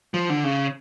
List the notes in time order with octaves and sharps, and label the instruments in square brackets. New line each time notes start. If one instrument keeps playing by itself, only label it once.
[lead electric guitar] F3
D3
C#3